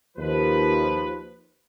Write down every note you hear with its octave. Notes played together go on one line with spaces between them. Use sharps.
D#2 F3 B4